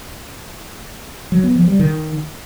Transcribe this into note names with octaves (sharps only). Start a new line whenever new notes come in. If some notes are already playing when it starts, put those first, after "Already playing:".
F#3
B3
F3
G3
D#3